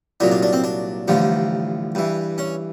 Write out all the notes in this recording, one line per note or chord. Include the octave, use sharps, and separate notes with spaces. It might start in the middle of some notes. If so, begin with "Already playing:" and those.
C2 A#2 F#3 D4
D4
D4
C4
D4
A1 G2 D3 F3
G2 E3
C#4